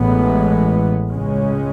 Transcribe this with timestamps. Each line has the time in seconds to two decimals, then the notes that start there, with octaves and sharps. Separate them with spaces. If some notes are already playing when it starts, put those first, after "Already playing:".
Already playing: A1 A2 E3 G#3 B3
1.11 C#2 C#3 G#3 C#4